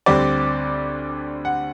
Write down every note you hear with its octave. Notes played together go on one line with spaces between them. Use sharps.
D2 D3 G3 C4 D5
F#5